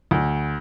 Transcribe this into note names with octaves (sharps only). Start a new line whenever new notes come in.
D2